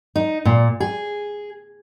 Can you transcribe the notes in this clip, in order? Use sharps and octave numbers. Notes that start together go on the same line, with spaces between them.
D#4
A#2
G#4